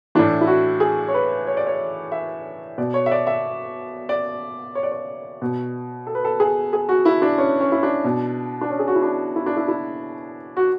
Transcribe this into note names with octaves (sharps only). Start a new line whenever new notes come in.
A2 E3 D4
E4
F#4
G#4
C#5
B4
C#5
D5
C#5
E5
B2 D5
C#5
E5
D5
E5
D5
C#5
D5
C#5
B2
A4
B4
A4
G#4
G#4
F#4
E4
D4
C#4
C#4
E4
D4
B2
D4
C#4
G#4
F#4
E4
D4
E4
D4
E4
E4
F#4